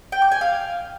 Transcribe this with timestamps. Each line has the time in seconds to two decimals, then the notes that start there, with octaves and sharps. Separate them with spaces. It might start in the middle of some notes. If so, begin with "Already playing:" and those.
0.12 G5
0.22 D6
0.32 G#5
0.41 F5